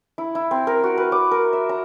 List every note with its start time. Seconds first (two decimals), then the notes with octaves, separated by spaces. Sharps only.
0.18 E4
0.35 E4
0.51 C4
0.67 A#4
0.84 F#4
0.98 B4
1.12 D6
1.31 A#4
1.53 E5
1.69 A#5